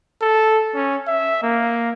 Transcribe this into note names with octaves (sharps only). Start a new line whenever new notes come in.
A4
C#4
E5
A#3